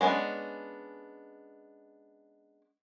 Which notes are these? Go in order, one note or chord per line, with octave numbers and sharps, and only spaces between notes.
G#3 B3 C#4 D4